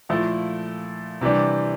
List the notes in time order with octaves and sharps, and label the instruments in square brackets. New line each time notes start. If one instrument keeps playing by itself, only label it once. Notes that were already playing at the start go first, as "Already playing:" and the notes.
[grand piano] A#2 F3 A3 E4 A4
C3 E3 G3 D4